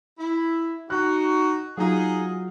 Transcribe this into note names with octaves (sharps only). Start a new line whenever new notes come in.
E4
D#4 F#4 F#6
F#3 D#4 F4 G#4